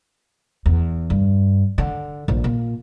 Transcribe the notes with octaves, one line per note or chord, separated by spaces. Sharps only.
E2
G2
D3
A#1
A#2